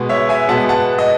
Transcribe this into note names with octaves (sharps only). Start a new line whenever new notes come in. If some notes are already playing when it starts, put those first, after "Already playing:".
Already playing: B2 G#3 B3
C#5 E5
E5 G#5
B2 G#3 B3 F#5 A5
F#5 A5
D#5